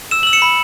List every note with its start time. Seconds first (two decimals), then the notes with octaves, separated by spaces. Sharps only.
0.11 E6 E7
0.23 E6 F#7
0.33 C#7 E7
0.42 B5